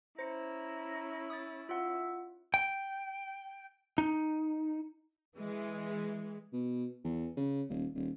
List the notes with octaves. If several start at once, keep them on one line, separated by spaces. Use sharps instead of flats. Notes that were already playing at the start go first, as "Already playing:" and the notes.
C#4 E4 C5 A#5 C#7
D#6 A6
F4 E5 F#5
G5
D#4
E3 G#3
B2
E2
C#3
D#1
D#1